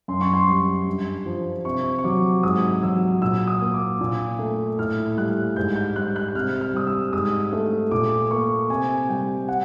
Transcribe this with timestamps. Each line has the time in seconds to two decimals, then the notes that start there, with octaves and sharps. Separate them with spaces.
0.08 F#2 C6
0.21 C#6
0.34 C6
0.48 G3
0.87 G2
1.26 F3
1.65 C3 C#6
1.98 C#6
2.05 F#3 D6
2.43 G#2 D#6
2.83 F#3 E6
3.22 A#2 E6
3.48 D#6
3.61 A#3
3.74 D6
4.01 A#2
4.39 A3
4.79 A2 F6
5.17 G3 F#6
5.56 G#2 G6
5.76 G6
5.96 G3 F#6
6.16 F#6
6.35 C3 F6
6.61 F6
6.74 G3 D#6
6.87 E6
7.13 G#2 D#6
7.53 A3
7.91 A#2 D6
8.31 A#3 C#6
8.70 C3 G#5
9.09 G3 G5
9.49 F#5